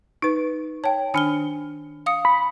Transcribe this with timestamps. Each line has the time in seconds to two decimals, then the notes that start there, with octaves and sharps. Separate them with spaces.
0.22 D#4 B4
0.84 C#5 G5 A5
1.14 D#3 D4 G#5 F6 G7
2.06 F5 D#6 C#7
2.25 B5